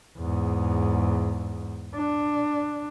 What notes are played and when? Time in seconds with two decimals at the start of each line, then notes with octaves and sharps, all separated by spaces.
0.18 E2 G#2
1.96 D4